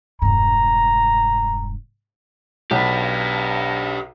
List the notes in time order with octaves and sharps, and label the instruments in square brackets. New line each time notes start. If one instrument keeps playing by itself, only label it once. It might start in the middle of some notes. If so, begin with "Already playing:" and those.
[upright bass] E1 G2 [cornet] A#5
[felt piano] B1 [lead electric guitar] G4 B4